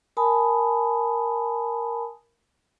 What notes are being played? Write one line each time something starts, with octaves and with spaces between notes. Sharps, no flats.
A#4 G#5 A5 B5 D#6